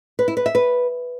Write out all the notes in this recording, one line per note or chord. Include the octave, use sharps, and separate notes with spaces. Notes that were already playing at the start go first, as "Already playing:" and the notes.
B4
E4
B4
E5
B4